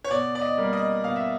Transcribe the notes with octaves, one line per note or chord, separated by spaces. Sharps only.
C#5
B2 D5
D5
D#5
G3 A#3
D#5
B2 F5
E5